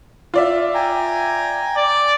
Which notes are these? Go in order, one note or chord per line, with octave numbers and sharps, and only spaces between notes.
F4 D5 E5
G5 G#5 A#5
D5